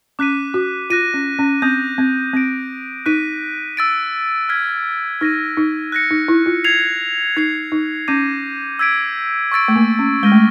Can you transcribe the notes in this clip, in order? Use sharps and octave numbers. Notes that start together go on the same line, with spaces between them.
C#4 D6 F#6 B6 D#7
F#4
F4 F#6 A#6 D#7
C#4
C#4
C4 D#6 G6 A#6
C4
C4 G6 A#6 D7
D#4 F#6 B6 D#7
E6 A6 D7
F6 G#6 B6
D#4 F6 A#6 D#7
D#4
F#6 A#6 C#7
D#4
E4
F4
G#6 C7 F7
D#4 G#6 C7 F7
D#4
C#4 D6 G6 A#6 D#7
E6 G#6 B6 D7
C#6 E6 A6 D7
A3
A#3
C#4
G#3 F6 A#6 D#7 G7
A3